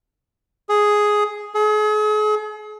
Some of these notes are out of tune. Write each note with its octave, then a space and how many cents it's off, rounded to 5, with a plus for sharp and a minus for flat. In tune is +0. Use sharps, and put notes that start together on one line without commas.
G#4 +5
G#4 +40